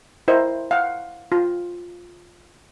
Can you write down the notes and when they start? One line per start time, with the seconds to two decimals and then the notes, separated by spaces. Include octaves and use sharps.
0.28 E4 A#4 C5 D#5
0.71 F5 F#5
1.32 F4